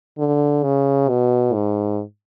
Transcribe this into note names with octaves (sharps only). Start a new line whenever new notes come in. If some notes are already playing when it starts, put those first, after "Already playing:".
D3
C#3
B2
G#2